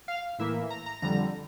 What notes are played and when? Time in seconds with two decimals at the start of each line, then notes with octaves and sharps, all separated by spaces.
0.08 F5
0.39 A2 E3 A#3 E5
0.70 A#5
0.86 A#5
1.02 F2 D3 G3 A#5